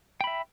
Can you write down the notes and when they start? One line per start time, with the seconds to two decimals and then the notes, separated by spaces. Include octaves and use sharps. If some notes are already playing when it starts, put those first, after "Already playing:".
0.21 G5
0.24 B5
0.27 E5